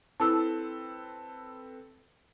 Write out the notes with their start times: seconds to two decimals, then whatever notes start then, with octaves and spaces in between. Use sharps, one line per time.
0.20 C4 E4 A4 B4 A5 E6